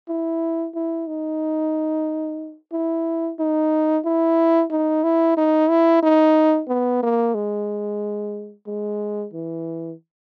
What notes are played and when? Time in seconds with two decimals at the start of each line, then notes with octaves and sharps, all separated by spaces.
0.09 E4
0.75 E4
1.08 D#4
2.73 E4
3.39 D#4
4.05 E4
4.70 D#4
5.04 E4
5.37 D#4
5.70 E4
6.03 D#4
6.69 B3
7.03 A#3
7.35 G#3
8.67 G#3
9.33 E3